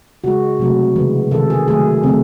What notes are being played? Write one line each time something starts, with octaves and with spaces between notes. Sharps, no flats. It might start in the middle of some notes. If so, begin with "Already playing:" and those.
C#3 G#3 F#4
C3 F#3 A3
C#3 E3 G#3
C3 D#3 G#3 A4
G#4
D#3 F#3 A3 G#4
C#3 F#3 A3 C4